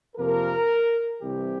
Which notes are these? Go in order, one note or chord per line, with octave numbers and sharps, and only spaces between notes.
F2 C3 F3 A#3 A#4
C2 C3 E3 G4